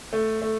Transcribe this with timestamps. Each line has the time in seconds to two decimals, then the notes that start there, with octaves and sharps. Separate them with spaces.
0.13 A3
0.42 A3